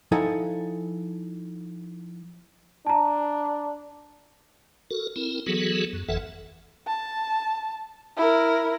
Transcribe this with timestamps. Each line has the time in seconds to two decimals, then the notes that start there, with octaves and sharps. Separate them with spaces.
0.12 F3 D#4 E4 A4 F#5 G#5
2.86 D4 A5 A#5
4.91 F#4 A4 A#4
5.16 C4 E4 A#4
5.46 E3 F#3 B3 F#4 G#4 A4
5.93 F#2
6.09 G1 F2 E3 A4 E5 F#5
6.87 A5
8.17 E4 A#4